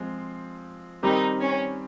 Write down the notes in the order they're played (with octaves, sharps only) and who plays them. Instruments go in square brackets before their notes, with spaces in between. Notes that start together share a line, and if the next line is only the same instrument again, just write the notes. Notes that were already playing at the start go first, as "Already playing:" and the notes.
Already playing: [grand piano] F3 G#3 C4
[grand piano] D#3 G3 C4 G4 A#4 [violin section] D#4
[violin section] C#4